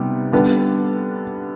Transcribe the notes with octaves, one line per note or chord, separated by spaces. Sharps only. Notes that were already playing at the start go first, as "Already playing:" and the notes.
Already playing: C3 G3 B3 D#4
D3 G3 B3 D4